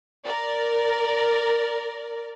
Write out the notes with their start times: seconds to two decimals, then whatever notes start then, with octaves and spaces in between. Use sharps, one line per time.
0.25 A#4 D5